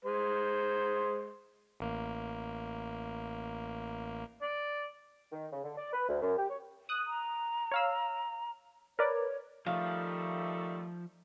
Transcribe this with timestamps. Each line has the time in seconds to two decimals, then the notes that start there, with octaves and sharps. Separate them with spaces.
0.05 G#3 C5
1.80 A1 A#3
4.42 D5
5.32 D#3
5.52 C#3
5.64 D3
5.78 D5
5.93 B4
6.09 D2
6.22 F#2
6.38 G4
6.49 C#5
6.89 D#6 F#6
7.07 A#5
7.72 C#5 F5 E6
8.99 A#4 B4 C#5 D5
9.66 D#3 F3 G3 A3 F5